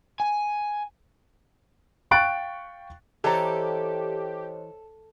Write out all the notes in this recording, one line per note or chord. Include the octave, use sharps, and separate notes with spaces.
G#5
F5 G5 C#6 F#6 A6 D7
E3 G4 A4 C5 C#5 D#5 A#5